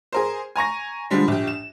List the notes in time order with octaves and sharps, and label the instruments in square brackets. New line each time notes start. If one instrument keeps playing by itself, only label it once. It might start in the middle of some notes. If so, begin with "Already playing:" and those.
[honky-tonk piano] G#4 A#4 C5
G#5 A#5 C#6 A#6
D3 F3 G3 G#3
A#1 G4
E7